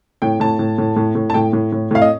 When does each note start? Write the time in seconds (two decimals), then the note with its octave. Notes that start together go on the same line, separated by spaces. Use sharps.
0.22 A2 G5
0.40 A2 A5
0.59 A2
0.78 A2
0.96 A2
1.15 A2
1.30 A5
1.34 A2 G5
1.53 A2
1.72 A2
1.91 A2 F5
2.02 D#5